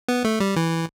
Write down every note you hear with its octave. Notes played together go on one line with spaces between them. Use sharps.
B3
A3
G3
E3